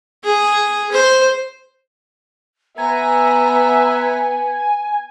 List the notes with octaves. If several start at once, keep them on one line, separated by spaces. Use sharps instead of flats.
G#4
C5
B3 B4 E5 G#5 A#5